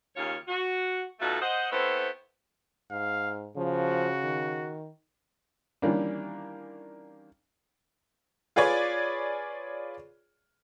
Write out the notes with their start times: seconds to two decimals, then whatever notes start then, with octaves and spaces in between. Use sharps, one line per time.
0.16 D#2 C#3 A#3 F4 C#5 F5
0.48 F#4
1.20 B2 A3 D#4 F4 F#4 A4
1.40 C5 D#5 F#5
1.70 B3 C4 E4 A4 C5 C#5
2.91 G#2 F5
3.57 C#3 F3 F#4
4.24 D#3
5.82 D#3 E3 G3 A#3 C#4 D4
8.56 F4 G#4 B4 C#5 D5